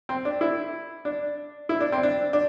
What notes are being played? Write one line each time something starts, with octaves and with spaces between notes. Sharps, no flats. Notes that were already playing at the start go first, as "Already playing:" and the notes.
C4
D4
E4
D4
E4
D4
C4
D4
D4